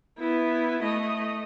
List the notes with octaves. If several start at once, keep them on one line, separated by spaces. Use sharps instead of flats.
B3 E4
A3 D#5